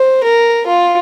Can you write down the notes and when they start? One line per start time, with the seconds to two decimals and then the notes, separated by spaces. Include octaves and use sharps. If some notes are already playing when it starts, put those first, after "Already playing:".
Already playing: C5
0.23 A#4
0.67 F4